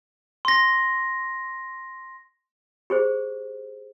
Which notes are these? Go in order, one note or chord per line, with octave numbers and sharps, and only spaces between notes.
C6 A#6
G4 G#4 C5